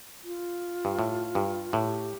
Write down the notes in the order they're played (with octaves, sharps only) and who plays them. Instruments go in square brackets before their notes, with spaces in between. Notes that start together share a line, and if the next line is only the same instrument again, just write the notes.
[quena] F4
[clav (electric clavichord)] G2
A2
G2
[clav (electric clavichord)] A2 [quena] G4